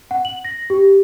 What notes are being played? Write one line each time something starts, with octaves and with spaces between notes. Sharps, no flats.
F#5
F#7
A#6
G4